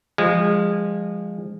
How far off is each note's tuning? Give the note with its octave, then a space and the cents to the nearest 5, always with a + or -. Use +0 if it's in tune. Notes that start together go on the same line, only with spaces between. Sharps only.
F3 +0 G#3 -25